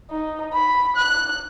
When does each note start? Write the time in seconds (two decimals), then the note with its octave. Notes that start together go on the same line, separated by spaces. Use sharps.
0.10 D#4
0.53 B5
0.96 F#6